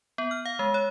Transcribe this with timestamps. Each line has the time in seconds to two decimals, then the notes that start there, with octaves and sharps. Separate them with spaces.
0.18 B3
0.31 F6
0.46 F5
0.59 G#3
0.74 C#5